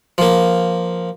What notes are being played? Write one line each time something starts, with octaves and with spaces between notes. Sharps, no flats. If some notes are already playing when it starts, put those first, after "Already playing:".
F3 A#3